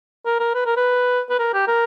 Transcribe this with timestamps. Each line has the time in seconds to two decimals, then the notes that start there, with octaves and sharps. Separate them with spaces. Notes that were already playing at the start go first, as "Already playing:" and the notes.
0.25 A#4
0.40 A#4
0.54 B4
0.66 A#4
0.77 B4
1.30 B4
1.39 A#4
1.54 G4
1.68 A#4